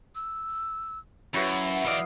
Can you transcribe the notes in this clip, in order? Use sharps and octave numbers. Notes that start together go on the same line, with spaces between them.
E6
F#2 E4 F#4 B4 C#5
E3 E4 D5 D#5 F5 D#6